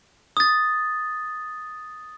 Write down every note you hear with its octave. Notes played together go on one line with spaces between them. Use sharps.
D#6 A6